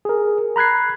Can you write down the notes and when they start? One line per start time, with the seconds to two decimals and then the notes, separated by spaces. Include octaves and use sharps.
0.05 G#4 A#4
0.56 A#5 B5 F#6 G#6 C7